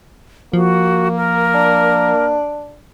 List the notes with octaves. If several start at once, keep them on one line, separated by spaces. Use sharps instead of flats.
F3 A#3 F#4
A#4
D4